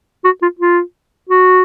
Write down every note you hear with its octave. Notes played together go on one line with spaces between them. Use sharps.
F#4
F4
F4
F#4